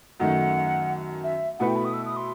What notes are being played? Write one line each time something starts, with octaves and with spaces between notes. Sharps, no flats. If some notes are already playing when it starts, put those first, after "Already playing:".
F#2 D#3 A3 F#5
E5
B2 A3 E4 B4 F#5
G5
B5
D#6
E6
D#6
C6